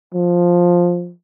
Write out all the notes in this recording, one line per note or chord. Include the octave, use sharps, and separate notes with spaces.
F3